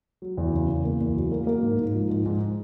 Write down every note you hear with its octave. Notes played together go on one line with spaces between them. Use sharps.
F#3
E2
C#3
E2
A#3
E2
F#3
A#3
A#3
G#2
G#2
F3
G#2
G#2